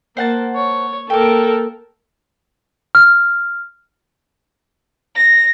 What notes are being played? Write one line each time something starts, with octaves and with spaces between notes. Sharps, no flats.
A#3 C5 F#5 A5
C#5
A#3 A4 A#4 G5 D6
F6
A#6